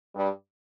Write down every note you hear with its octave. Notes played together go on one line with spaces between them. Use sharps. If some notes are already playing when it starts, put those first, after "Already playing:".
G2 G3